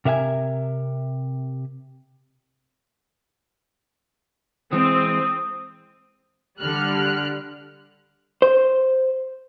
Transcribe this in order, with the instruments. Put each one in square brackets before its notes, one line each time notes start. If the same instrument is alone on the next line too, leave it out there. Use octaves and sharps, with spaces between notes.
[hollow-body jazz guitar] C3 A#4 E5 F5 G#5
[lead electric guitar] E3 G#3 [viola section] C4 [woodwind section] D#6
[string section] D3 G3 F6 F#6
[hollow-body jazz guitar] C5